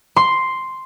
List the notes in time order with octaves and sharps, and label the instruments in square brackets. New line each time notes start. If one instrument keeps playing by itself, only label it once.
[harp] C6